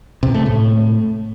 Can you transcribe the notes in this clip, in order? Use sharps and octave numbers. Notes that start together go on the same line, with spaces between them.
C3
A3
A2